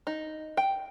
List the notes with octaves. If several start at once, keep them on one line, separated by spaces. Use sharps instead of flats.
D#4
G5